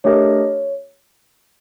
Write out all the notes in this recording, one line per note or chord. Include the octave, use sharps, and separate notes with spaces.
A3 D4 G4 A#4 C#5 D#5